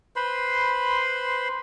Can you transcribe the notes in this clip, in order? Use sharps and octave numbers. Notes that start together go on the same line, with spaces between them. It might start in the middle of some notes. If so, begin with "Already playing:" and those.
B4 C5 B5 C6